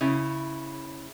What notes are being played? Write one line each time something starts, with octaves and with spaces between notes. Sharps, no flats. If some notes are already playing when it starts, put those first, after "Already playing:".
C#3 E4